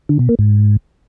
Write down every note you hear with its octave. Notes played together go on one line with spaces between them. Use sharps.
D3
B2
A#3
G#2